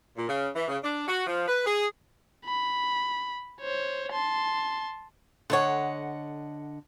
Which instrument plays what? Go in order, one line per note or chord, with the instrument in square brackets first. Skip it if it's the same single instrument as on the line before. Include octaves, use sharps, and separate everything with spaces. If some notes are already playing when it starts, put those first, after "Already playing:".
[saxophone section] A#2
C#3
E3
C#3
D4
F#4
F3
B4
G#4
[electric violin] B5
C5 C#5
A5 C6
[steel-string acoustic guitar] D3 D#5 F#5 [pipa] A3 C#5